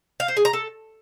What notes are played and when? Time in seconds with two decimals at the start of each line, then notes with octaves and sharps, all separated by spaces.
0.20 F5
0.28 C5
0.37 G#4
0.45 A#5
0.53 A4